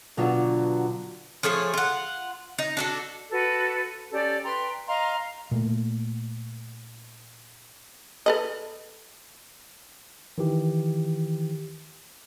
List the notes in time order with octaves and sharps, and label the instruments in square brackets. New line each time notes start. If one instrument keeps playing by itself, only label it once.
[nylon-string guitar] B2 D3 F#3 B3 D4 F4
[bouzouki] F3 A3 G#4 C#5
F4 F#5
D#4
D4 F#4 A4
[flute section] F#4 A4 B4
C#4 G4 A4 D5
B4 G5 A#5 C6
D#5 F5 A#5 C6
[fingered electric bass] A#2 A3
[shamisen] A4 B4 D#5
[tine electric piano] D#3 E3 G4